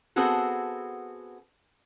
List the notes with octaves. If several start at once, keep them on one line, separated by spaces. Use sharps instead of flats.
B3 C4 F#4 G#4 A4